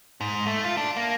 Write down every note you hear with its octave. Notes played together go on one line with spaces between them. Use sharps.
G#2
A3
F4
D4
A#3